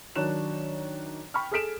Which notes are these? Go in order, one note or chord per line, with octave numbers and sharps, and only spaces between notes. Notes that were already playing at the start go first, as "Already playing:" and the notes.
D#3 F#3 D4 C#5 F#6 E7
G5 B5 C#6 F6
G#4 A4 F6 B6 D7 E7